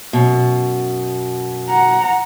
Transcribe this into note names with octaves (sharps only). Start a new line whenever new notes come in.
F#2 B2
F#5 A#5